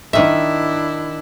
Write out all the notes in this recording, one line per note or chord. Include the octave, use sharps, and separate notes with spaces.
D#3 D4 E4 E5